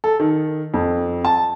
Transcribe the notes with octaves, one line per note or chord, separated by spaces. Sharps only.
A4
D#3
F2
A5